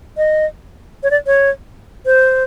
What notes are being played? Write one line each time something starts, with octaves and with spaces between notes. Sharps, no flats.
D#5
C#5
D5
C#5
C5